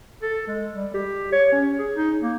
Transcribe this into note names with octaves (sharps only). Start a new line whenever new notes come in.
A4
G#3
G3
G4
C#5
C#4
G#4
D#4
A#3